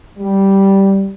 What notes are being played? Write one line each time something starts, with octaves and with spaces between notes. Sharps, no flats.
G3